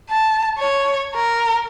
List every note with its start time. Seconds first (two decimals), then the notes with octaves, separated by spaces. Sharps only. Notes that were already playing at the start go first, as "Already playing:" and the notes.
0.10 A5
0.59 C#5
1.16 A#4